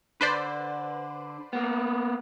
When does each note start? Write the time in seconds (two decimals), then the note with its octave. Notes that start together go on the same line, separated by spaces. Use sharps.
0.21 D3 B4 C5 D5
1.53 A#3 B3